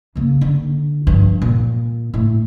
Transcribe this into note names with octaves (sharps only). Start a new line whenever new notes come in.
C#3 A#3
D3
G2 F3
A#2
A2